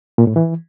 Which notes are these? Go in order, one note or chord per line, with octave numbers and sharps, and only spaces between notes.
A#2
A2
E3